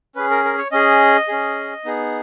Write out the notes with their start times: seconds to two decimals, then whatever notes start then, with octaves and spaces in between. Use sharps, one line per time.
0.15 C#4 G#4 B4
0.30 A#4
0.45 A#4
0.58 C#5
0.71 C#4 G#4 D#5
1.28 C#4 G#4
1.85 B3 D#4 G#4